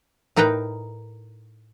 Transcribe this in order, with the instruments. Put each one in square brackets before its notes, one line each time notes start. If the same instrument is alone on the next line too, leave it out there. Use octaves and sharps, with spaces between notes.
[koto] A2 D#4 A#4 B4 G5 A#5